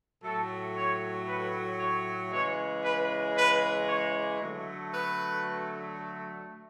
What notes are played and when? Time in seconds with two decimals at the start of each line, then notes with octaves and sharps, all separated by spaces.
0.23 A2 F#3 A3 A4
0.75 C#5
1.28 B4
1.79 C#5
2.31 C#3 E3 G#3 C#5
2.84 B4
3.36 B4
3.89 C#5
4.40 D3 F#3 A3
4.92 B4